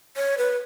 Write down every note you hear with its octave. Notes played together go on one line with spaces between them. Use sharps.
C#5
B4